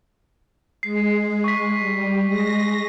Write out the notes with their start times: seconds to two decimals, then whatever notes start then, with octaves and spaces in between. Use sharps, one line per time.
0.83 G#3 C7
1.44 C#6 B6
1.79 G3
2.25 G#3 A#6